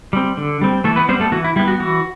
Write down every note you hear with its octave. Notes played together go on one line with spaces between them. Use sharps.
G3 C4
D3
G3 C4
E3 A3 A4
B3 B4
G3 B3 C4 C5
A3 A4
E3 F#4
E4
G3 B3 E4
F#4
E3 F#4